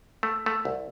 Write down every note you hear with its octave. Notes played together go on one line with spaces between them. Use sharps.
A3
A3
C2